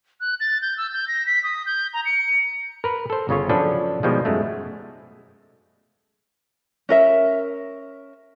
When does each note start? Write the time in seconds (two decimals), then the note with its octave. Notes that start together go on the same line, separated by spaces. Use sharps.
0.21 F#6
0.40 A6
0.62 G6
0.77 E6
0.93 G6
1.08 A#6
1.26 B6
1.43 D#6
1.66 G6
1.93 A#5
2.06 C#7
2.84 A#4 B4
3.10 A4 C5
3.29 G1 C#3 C#4 F4 C#5
3.49 F3 F#3 C#4 D4 A4 B4
4.03 B2 D#3 F3 G3 G#3
4.25 F#2 G#3 A3
6.89 C#4 A#4 E5